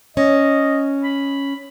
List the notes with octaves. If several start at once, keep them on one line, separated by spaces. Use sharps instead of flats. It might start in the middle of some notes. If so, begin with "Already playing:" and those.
C#4 D#5
B5